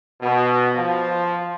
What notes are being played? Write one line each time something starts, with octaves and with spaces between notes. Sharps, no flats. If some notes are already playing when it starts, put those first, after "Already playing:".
B2
F3